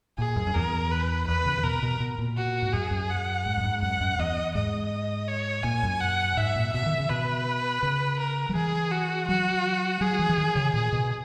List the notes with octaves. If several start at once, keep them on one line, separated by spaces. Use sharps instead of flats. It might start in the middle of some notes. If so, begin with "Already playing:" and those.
A#2 G#4
F#2
F#2
E2 A#4
B4
E2 B4
C#3
C#3
B2 A#4
B2
B2
A#2
F#4
G#2
F#2 G#4
F#2
F#5
G#2
F#2
G#2
F#2 F#5
F#2
E2 D#5
G#2 D#5
C#5
A#2 G#5
F#2
F#5
G#2 E5
A#2
B2 E5
D#3
C#3
B2 B4
C#3
A#4
F#3
E3 G#4
F#4
F#3 F#4
F#3 G#4
E3
E3
D#3
C#3
A#2 G#4
B2